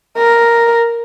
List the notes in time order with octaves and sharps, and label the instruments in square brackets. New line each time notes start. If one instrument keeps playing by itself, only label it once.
[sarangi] A#4